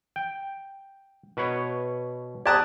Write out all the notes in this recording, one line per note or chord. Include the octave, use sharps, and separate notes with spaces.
G5
B2 B4 C#5
G4 D5 A5 A#5 D#6 F#6 G#6